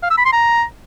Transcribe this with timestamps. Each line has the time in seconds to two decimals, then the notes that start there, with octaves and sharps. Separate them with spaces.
0.03 F5
0.10 E6
0.18 B5
0.25 C6
0.33 A#5